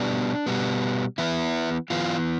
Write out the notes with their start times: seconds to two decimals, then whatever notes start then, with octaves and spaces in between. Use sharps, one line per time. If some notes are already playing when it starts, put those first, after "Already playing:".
Already playing: B2 G3 B3 D4
0.46 B2 G3 B3
1.18 E3 B3 E4
1.90 E3 B3 F4